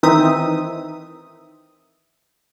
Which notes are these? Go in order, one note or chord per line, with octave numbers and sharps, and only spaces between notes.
D#3 E3 C4 D#4 E5 D#6